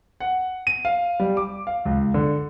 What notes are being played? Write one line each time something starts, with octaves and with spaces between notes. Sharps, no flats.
F#5
D#7
F5
G3
D6
F5
C#2
D3